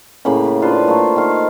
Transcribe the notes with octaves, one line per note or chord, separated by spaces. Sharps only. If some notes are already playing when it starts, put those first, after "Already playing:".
A2 C#3 A#3 B5
D4 F4 B4 C5
A3 A#3
D#3 F5